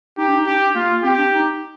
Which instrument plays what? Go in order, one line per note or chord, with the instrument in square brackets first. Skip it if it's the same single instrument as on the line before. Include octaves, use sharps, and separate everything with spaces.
[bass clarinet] D#4 [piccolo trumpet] G4
[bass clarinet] D4
D#4
[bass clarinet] D4 [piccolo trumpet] G4
[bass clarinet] A#3 [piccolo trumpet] F4
[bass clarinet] C4 [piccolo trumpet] G4
[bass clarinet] D4
D#4